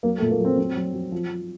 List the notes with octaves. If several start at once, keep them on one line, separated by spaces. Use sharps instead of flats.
F#3 A#3
A3
A#2
A#3
F#3 C4
F#3 C4
F#3
F#3
F3
F3